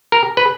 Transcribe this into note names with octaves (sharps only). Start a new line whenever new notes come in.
A#4
B4